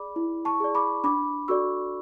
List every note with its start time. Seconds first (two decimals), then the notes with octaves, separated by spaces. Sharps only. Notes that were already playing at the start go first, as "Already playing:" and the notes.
Already playing: G#4 D5 B5 D6
0.16 E4
0.45 A5 C#6
0.60 G#4 D5
0.75 B5 D6
1.04 D4 B5 D6
1.48 F#4 A4 D5 C#6 E6